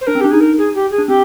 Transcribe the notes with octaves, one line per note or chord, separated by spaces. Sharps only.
C5
D4 A#4
C4
D4 G4
D#4 G#4
A#4
G#4
G4
G#4
D4
C4 G4